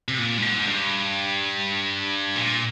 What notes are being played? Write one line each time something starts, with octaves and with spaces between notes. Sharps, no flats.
C3
A#2
G2
G#2
G2
A#2